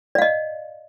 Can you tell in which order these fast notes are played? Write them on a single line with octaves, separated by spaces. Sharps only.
D5 F5 D#5